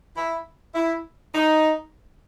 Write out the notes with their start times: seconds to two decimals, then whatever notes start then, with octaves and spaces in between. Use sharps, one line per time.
0.17 E4
0.75 E4
1.35 D#4